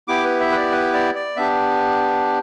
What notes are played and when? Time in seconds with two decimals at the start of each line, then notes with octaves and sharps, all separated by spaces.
0.08 B3 E4 G4 D6
0.24 B4
0.40 E5
0.52 B4
0.56 D5
0.72 B4
0.93 D5
1.15 D5
1.36 B3 D4 G4 E5